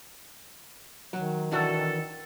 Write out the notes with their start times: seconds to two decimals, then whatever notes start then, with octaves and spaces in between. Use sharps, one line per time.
1.13 D#3 F#3
1.52 E3 D4 F#4 A4